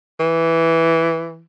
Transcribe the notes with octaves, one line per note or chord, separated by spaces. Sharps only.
E3